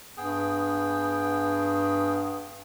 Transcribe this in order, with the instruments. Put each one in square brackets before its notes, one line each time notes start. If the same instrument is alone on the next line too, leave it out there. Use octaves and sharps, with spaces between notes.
[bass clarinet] G2 [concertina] B3 G#4 G5